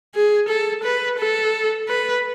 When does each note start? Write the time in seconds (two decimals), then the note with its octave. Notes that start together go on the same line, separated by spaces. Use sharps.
0.15 G#4
0.49 A4
0.84 B4
1.18 A4
1.88 B4